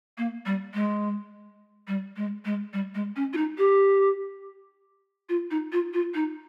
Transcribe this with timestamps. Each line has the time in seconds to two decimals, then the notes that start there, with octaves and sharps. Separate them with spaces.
0.18 A#3
0.46 G3
0.74 G#3
1.88 G3
2.16 G#3
2.45 G#3
2.73 G3
2.95 G#3
3.16 C#4
3.33 F4
3.37 D#4
3.58 G4
5.29 F4
5.51 D#4
5.72 F4
5.93 F4
6.14 D#4